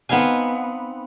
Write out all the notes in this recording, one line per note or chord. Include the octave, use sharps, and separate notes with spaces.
B3 C4 D#4 F5 G#5